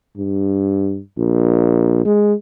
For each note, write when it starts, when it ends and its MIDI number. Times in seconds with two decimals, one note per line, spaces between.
0.17 1.00 43
1.19 2.01 34
2.06 2.34 56